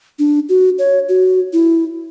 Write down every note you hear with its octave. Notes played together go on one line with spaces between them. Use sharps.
D4
F#4
C#5
F#4
E4